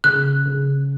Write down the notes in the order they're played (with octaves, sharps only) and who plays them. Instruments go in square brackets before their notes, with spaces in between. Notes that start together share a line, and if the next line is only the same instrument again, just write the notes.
[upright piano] C#3 [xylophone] F#6
[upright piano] C#3